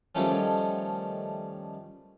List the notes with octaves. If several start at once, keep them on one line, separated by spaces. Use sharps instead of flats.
D#3 F3 G3 A3 C#4